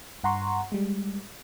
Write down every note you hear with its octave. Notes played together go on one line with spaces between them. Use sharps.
G2 F#5 A#5 C6 C#6
G3 G#3